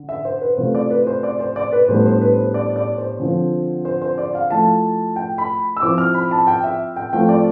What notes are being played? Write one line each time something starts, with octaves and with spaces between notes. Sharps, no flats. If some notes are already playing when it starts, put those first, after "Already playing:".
Already playing: D3
E5
C5
B4
C3 E3 A3 C4 F4 C5
D5
B4
C5
D5
C5
D5
B4
A2 E3 G3 B3 D4 C5
C5
B4
C5
D5
D5
C5
D3 F3 C4
C5
C5
D5
F5
F3 A3 E4 A5
G5
B5
E6
F3 C4 E4 D6
F6
B5
A5
G5
E5
G5
F3 A3 C4 F4 G5
D5